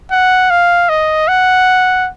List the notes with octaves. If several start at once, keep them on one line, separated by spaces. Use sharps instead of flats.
F#5
F5
D#5
F#5